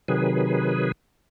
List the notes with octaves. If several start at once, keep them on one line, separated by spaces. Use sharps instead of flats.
C3 D#3 F#3 G#4 B4